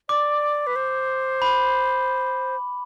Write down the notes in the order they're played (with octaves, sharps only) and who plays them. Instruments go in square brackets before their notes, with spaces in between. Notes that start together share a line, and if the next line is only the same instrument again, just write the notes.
[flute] D5 [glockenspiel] D6
[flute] B4
C5
[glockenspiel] B5